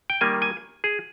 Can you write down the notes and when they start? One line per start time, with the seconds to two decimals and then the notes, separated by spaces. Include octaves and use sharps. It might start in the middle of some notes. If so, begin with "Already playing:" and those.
0.10 G5
0.21 D#3 G3 A#3 G#5
0.42 G#5
0.84 G#4